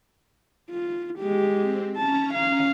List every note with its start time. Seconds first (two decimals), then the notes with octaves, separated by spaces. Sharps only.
0.70 F4
1.19 G#3 G4
1.61 C4
1.97 C#4 A5 A#5
2.34 F5